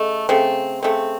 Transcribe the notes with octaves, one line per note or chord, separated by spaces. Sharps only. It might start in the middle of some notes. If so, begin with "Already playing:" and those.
Already playing: C#3 A3 D#5
C#3 A3 C4
C#3 A3 C4